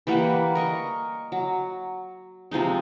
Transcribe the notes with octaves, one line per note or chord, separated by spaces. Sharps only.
E3 G3 A#3 F#5
A#4 D#5 C#6
F#3
C3 F3 G#3 D#4